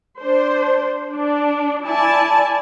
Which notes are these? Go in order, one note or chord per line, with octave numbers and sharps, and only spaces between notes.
D4 C5
D4
E4 D5 G#5 A5